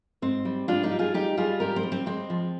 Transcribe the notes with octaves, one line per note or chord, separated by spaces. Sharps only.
G#2 C4
G3
G#2 D4 F4
D#4 G4
G3
F4 G#4
G#2 D#4 G4
G3 F4 G#4
G#2 G4 A#4
C4
G3
C4
G#3 C4
F3